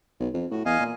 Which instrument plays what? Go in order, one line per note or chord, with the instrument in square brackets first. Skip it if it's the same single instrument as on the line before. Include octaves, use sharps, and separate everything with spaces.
[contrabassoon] B1
F2
[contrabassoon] A2 [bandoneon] F#4
[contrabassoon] E2 [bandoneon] D#5 F5 G#5
[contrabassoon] A#2